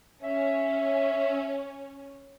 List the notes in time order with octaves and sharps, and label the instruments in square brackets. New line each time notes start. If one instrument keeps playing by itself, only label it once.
[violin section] C#4 [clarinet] E5